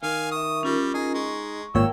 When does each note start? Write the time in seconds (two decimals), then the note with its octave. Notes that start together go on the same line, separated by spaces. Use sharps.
0.03 D#3 F5 G#5
0.31 E5 C#6 D#6
0.63 G3 C#4 F4 A#4
0.94 D#4 G#4
1.14 G#3 C#6
1.75 G#1 A#2 A#3 C#5 G5 E6